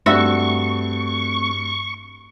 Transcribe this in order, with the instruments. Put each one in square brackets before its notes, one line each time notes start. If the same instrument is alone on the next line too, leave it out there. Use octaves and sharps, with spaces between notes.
[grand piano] G2 [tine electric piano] A3 C4 [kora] F#4 E5 [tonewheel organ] C#6